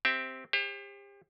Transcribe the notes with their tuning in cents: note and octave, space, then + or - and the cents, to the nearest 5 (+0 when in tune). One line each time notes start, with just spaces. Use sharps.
C4 +0 G4 +0 E5 +5
G4 +35 C5 +35